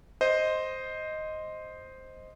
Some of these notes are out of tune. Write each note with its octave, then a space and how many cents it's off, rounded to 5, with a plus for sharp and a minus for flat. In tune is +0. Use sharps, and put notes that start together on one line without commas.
C5 +0 D#5 +0